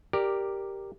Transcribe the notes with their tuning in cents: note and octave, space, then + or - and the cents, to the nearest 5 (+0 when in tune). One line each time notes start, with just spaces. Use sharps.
G4 +0 A#4 +0 D5 +10